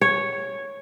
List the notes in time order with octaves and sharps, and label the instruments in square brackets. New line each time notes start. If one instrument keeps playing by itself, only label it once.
[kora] C#5